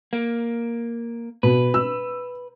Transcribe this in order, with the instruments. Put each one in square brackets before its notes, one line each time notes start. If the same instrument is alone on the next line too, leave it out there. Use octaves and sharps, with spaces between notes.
[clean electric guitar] A#3
[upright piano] B2 [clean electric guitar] B4
[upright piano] E6